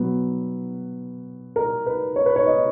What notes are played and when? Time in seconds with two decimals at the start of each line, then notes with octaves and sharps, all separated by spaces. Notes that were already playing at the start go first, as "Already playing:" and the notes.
Already playing: B2 F#3 B3 B4
1.56 A#4
1.86 B4
2.16 C#5
2.26 B4
2.36 C#5
2.46 D#5